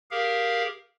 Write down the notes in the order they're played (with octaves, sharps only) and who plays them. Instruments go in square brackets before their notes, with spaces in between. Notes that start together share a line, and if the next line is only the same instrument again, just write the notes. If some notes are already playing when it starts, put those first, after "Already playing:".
[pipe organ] G4 G#4 A#4 F5